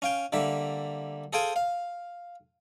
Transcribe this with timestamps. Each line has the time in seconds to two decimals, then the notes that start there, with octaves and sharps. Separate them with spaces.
0.02 C#4 F5 G5
0.33 D3 G3 A#3 E5
1.33 G#4 A4 C5 F5 G5 G#5
1.56 F5